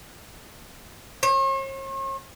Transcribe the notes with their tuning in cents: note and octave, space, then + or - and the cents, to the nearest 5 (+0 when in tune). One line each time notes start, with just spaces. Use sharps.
C#5 -45